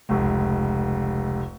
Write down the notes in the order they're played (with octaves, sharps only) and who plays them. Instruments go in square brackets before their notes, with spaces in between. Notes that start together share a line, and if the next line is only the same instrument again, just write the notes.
[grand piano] F1 C#2